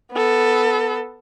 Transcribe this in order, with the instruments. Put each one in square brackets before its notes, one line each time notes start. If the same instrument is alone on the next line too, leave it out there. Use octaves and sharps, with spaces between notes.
[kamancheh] B3 A4